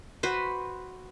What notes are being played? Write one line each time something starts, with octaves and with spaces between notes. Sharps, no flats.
F#4 B4 C5